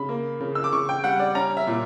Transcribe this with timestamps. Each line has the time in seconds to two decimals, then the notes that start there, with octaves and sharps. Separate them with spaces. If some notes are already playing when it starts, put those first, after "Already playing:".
Already playing: C#3 B5
0.09 A#3
0.41 C#3
0.55 E6
0.64 D6
0.73 C#3 C#6
0.89 G5
1.04 G3 F#5
1.19 D5
1.35 C#4 A#5
1.57 E5
1.67 A#2